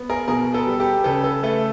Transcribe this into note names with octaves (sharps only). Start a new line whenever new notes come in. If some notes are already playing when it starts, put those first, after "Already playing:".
Already playing: B3
G#4 A#4
B2 G#4 A#4
A4 B4
G3
G4 A4
C#3 A4 B4
A4 B4
A3 A4 B4